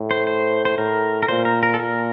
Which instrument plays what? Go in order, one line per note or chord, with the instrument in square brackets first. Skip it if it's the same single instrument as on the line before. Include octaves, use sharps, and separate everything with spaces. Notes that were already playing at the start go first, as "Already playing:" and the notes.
Already playing: [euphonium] A2
[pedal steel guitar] C5
C5
C5
[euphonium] A2 [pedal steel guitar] A#4
[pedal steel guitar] A#4
[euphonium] A#2 [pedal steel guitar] C5
[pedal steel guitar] A#4
A#4
A4
[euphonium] A#2 [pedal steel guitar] A#4